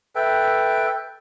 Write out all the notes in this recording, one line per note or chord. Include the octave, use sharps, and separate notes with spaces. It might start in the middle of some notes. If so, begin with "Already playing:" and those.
A4 B4 E5 G5